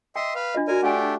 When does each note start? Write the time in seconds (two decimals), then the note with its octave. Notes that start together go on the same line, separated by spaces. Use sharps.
0.16 D#5 E5 G5 C6
0.35 B4 F5
0.55 D4 F4 D#5
0.68 F#4 A#4 D5 G#5
0.83 A3 D4 G4 F#5 G#5